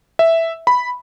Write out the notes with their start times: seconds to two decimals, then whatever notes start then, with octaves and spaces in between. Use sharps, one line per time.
0.19 E5
0.67 B5